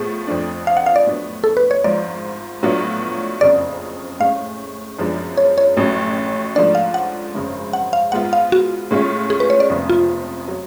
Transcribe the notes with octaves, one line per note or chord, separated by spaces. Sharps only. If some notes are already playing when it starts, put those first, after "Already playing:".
Already playing: A2 F3 B3 G#4
F2 F3 A3 D4
F5
F#5
F5
D5
A2 F#3 B3 D4
A4
B4
C#5
G#1 G#2 F3 D5
A2 F#3 B3 D4 F4
F#1 F2 C#3 D5
A2 G#3 C#4 F5
F#2 F3 G#3 B3 D4
C#5
C#5
A1 A2 F#3 C#4
G#2 F3 A3 D4 D5
F5
F#5
G#1 F#2 C#3 G#3
F#5
F5
G#2 G#3 B3 F4 F#5
F5
F#4
A2 G#3 C#4 F4
G#4
B4
C#5
D5
F1 F2 C#3 F3 B3
F4
F#3